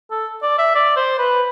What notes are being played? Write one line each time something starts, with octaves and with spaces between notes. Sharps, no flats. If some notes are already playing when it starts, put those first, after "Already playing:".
A4
D5
E5
D5
C5
B4